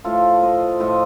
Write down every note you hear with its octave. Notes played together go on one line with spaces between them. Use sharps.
A2 F3 A3 F4 A4
C5 D#5
A2 F3 A3 C5 D#5